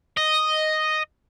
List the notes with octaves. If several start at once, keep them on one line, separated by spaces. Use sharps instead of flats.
D#5